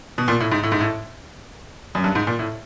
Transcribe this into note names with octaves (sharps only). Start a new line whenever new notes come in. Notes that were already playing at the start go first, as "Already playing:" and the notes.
B2
A#2
A2
G#2
A2
G#2
A2
F#2
G2
G#2
A#2
A2